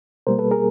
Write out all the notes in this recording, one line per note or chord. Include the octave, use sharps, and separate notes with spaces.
B2 G3 A#3 A#4 C5
A4 B4
G#4 A#4